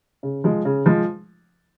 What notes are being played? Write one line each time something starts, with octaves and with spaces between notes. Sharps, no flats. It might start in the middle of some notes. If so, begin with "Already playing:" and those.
C#3
F3 G#3
C#3
F3 G#3